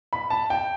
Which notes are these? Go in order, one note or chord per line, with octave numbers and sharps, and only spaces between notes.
B5
A5
G5